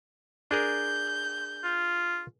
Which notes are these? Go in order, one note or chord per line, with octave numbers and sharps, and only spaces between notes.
D4 G#4 A#4 G6
F4